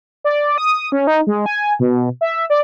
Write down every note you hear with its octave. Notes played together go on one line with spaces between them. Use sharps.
D5
D#6
C#4
D#4
G#3
G#5
B2
E5
D5